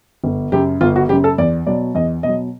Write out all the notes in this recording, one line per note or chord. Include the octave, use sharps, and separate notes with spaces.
G1
F#2 C#3 G4
G1 F4
F#4
F#2 C#3 G4
A4
E2 D5
B2 F#3 D5
E2 D#5
B2 F#3 D#5